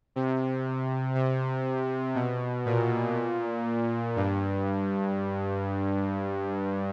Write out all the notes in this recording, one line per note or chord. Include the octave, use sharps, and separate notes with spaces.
C3
C3
B2
A#2
G2